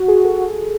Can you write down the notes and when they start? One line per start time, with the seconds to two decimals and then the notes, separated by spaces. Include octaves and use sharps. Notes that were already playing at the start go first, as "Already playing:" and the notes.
Already playing: F#4
0.08 G#4
0.25 A4